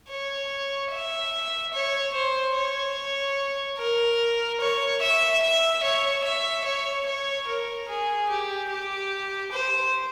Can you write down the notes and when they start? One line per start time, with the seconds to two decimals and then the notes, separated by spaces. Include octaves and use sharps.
0.10 C#5
0.91 E5
1.74 C#5
2.14 C5
2.55 C#5
3.78 A#4
4.60 C#5
5.02 E5
5.42 E5
5.83 C#5
6.24 E5
6.65 C#5
7.06 C#5
7.48 A#4
7.88 G#4
8.29 G4
8.70 G4
9.52 C5